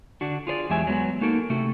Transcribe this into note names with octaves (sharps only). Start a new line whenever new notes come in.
D3 D4 F#4
F4 G#4 C5 D5
E2 F#3 G#3 G4 E5 G#5
F#3 G#3 B3
A#3 D#4 F#4 A4 A#4
C3 A3 F#4 A4